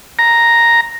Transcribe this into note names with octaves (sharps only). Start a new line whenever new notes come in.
A#5